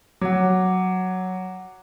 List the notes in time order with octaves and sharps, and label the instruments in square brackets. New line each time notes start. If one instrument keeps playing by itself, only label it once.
[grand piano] F#3 [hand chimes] F#5 D6